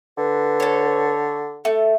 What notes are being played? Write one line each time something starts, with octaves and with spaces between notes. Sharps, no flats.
D3 B4
A4 C#5
A3 A4